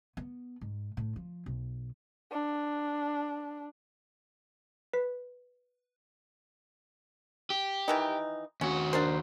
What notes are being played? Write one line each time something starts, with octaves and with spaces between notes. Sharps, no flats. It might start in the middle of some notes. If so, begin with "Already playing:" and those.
B3
G#2
A2
F3
B1
D4
B4 B6
G4
D#3 E3 D#4
D#2 C#4 F#4
D4 A#4 C5